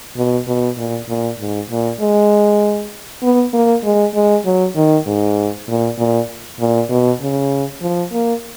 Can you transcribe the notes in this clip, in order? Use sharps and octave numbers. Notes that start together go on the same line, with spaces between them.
B2
B2
A#2
A#2
G#2
A#2
G#3
B3
A#3
G#3
G#3
F#3
D#3
G#2
A#2
A#2
A#2
B2
C#3
F3
A#3